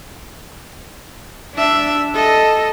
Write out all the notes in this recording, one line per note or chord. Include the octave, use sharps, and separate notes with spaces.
D4 E5
A4 D#5